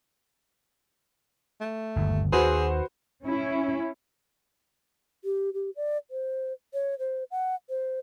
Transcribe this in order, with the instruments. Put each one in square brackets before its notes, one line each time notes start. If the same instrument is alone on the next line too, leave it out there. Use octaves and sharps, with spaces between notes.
[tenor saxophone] A3
[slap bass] G1 D#2
[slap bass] D#2 [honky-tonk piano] F#4 B4 C5 [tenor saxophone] G#4
[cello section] C#4 E4
[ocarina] G4
G4
D5
C5
C#5
C5
F#5
C5